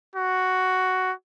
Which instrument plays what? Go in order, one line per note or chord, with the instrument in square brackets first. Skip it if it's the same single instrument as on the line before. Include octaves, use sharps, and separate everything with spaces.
[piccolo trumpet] F#4